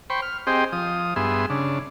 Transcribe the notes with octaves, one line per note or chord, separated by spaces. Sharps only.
C5 G5 B5 C#6
F6
C4 G4 G#4 C5 D#5 G5
F3 D#6
G2 B3 G#4 E5 C6
C#3 D4